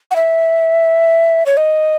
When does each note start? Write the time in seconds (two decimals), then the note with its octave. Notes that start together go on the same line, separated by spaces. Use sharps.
0.11 F#5
0.16 E5
1.46 C#5
1.57 D#5